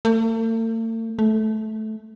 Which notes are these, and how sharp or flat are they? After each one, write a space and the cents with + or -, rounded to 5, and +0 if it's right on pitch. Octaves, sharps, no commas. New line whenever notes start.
A3 +45
A3 -15